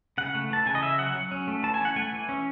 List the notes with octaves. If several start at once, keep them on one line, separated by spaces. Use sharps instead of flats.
C#3 F#5
A3
E3 A5
C#3 G#5
D#5
C#4 E5
F#3 F#5
F#3
C#4
A3
E3 A5
G#5
C#4 F#5
A3 G#5
E3
C#4